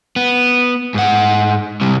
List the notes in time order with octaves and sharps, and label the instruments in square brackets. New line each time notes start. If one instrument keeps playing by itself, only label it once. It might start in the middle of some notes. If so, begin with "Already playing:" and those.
[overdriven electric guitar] B3
G#2 F#5
C3 G3